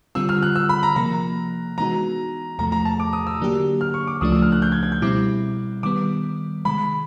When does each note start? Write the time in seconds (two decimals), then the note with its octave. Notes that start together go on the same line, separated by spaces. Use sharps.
0.15 D3 G3 C4 F4 E6
0.29 F6
0.42 F#6
0.56 E6
0.69 B5
0.83 A#5
0.96 C3 F3 A#3 A#5
1.78 E3 G#3 B3 D#4 F#4 A#5
2.59 E2 C3 F3 A3 A#5
2.72 A#5
2.85 A5
3.00 D6
3.13 D#6
3.27 E6
3.39 D3 F#3 A#3 D4 G4
3.81 F6
3.94 C#6
4.07 D6
4.21 C#2 C#3 F3 A3 D4 D#6
4.32 E6
4.42 F6
4.52 F#6
4.62 G6
4.72 G#6
4.83 G#6
4.92 G6
5.02 B2 G3 C4 E4 D6
5.83 D#3 G3 B3 D6
6.65 C3 D#3 G#3 B5